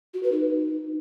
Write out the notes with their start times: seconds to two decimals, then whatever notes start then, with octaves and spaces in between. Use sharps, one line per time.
0.14 F#4
0.23 B4
0.32 D#4